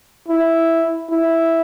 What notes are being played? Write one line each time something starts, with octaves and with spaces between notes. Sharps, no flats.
E4
E4